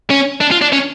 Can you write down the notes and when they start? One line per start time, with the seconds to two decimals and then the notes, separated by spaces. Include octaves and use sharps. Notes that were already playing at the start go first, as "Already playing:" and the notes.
0.11 C#4
0.41 D4
0.52 F4
0.62 D4
0.73 C#4